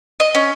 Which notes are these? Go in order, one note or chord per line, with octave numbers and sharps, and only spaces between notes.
D#5
C#4